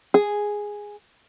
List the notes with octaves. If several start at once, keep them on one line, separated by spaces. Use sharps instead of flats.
G#4